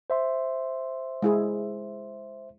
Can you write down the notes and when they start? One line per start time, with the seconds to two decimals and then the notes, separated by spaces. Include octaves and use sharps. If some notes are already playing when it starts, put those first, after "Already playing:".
0.10 C5 E5 C6
1.22 G#3 E4 G#4